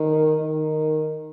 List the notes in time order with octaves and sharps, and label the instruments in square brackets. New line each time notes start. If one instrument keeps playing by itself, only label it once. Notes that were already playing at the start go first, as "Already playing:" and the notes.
Already playing: [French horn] D#3
D#3